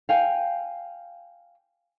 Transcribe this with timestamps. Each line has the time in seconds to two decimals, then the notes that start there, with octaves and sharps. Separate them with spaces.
0.09 F5 G5 G#5